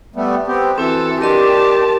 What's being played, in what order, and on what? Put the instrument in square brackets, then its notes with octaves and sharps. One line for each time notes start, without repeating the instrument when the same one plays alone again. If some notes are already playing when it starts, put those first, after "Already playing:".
[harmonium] G3 A3 B3
B3 C4 G4
[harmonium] E3 [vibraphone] C4 E4 F#4 [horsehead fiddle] A4
[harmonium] D4 [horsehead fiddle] G4 A5 [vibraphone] A#4 D#5 C6